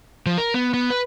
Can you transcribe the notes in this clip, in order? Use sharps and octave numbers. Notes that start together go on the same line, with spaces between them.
F3
A#4
B3
B3
B4